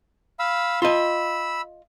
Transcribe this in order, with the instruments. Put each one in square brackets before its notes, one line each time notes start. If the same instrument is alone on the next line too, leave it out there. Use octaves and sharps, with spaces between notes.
[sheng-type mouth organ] F5 B5 E6
[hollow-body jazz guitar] F4 D#5 [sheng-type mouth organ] B5 E6